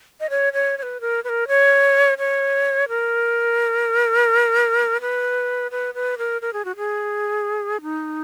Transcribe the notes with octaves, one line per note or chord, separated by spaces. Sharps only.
D#5
C#5
C#5
C#5
B4
A#4
B4
A#4
C#5
C#5
A#4
B4
B4
B4
A#4
A#4
G#4
F#4
G#4
D#4